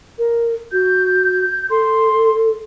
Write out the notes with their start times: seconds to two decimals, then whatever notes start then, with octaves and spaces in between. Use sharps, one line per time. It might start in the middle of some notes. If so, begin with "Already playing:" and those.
0.19 A#4
0.72 F#4 G6
1.70 A4 C6